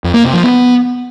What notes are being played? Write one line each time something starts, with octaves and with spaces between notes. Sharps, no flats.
F2
A#3
C3
F3
B3